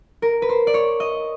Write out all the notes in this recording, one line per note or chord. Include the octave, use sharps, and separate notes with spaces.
A#4
B4
C5
D5
C#5
D#5